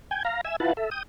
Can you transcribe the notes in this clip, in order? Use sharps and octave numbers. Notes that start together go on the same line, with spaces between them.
G5 G#5
F5 A#5
E5 G#5 E6
E4 F4 B4 F#5 A5
A4 E5
G5 D#6